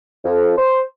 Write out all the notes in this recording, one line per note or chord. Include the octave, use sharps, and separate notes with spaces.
F2
C5